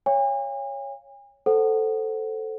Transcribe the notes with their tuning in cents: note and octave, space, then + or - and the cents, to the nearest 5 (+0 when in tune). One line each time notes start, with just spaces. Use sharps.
C#5 +0 F5 +5 G#5 -45
A4 +0 C5 +0 F#5 +10